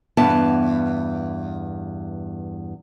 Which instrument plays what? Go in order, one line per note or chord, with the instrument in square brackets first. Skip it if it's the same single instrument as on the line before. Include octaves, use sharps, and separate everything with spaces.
[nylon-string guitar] E2 G2 B3 A5